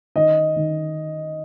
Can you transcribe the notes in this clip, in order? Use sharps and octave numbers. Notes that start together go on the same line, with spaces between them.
D#3 D#5
D#3